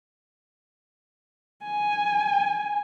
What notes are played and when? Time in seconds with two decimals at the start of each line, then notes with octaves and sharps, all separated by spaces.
1.64 G#5